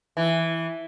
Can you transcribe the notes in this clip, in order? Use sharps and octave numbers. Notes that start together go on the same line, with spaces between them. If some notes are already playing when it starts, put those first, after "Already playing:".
E3